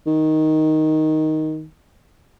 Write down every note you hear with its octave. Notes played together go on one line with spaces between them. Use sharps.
D#3